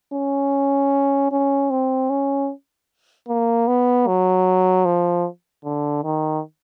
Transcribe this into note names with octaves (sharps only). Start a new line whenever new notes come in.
C#4
C#4
C4
C#4
A#3
B3
F#3
F3
D3
D#3